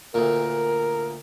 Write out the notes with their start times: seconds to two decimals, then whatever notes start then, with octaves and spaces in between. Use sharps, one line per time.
0.14 D2 A#2 A#4